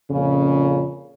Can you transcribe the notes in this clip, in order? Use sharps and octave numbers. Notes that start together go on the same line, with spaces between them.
F2 A#2 C#3